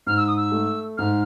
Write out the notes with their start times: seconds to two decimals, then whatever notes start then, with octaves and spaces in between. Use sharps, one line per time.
0.07 G#2 F6
0.17 E6
0.27 D#6
0.37 E6
0.52 A3
0.98 G#2 F6